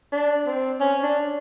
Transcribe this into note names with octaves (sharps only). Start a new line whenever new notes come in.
D4
C4
C#4
D4